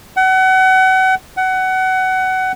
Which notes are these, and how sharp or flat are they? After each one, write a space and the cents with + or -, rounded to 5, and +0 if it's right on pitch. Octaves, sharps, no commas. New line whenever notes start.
F#5 +30
F#5 +20